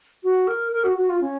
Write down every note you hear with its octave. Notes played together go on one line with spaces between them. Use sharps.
F#4
A#4
A#4
F#4
F#4
F4
C#4